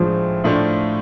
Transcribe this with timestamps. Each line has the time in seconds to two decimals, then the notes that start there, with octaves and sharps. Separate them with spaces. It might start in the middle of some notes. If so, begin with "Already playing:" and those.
Already playing: A2 F3 G#3 D4 G#4
0.44 A2 F3 A3 D4